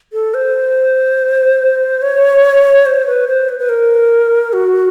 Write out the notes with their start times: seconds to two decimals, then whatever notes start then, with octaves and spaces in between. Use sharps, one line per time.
0.13 A4
0.34 C5
2.02 C#5
2.86 C5
3.06 B4
3.28 C5
3.49 B4
3.59 B4
3.69 A#4
4.53 F#4